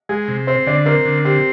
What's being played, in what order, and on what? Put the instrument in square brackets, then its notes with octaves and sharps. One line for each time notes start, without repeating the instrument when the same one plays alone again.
[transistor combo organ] G#3 [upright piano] G#4
[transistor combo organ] C3
[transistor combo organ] C4 [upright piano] C5
[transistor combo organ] D3 [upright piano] D5
[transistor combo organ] C4 [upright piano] A#4
[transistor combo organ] D3
[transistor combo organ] C4 [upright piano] G4